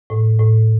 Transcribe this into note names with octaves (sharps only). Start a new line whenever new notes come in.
A2
A2